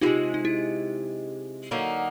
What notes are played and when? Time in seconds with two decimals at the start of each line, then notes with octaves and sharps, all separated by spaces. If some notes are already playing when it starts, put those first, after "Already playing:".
0.01 C3 E3 D#4 F4
0.06 G#3
0.34 D#4
0.45 E4
1.71 D3 F#3 A#3 D#4